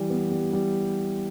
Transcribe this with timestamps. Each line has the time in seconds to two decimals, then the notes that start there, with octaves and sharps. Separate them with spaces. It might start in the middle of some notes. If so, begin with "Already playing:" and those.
Already playing: E3 G3
0.10 B3
0.32 G3
0.53 G3